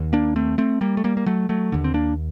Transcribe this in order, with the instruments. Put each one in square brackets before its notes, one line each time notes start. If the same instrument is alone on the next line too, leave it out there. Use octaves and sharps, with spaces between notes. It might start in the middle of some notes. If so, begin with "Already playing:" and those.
Already playing: [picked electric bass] D#2
A#3 D4
A3 C4
A3 C4
G3 A#3
A3
G3 A#3
A#3
F#3 A3
F#3 A3
D#2 D3
C4
A#3 D4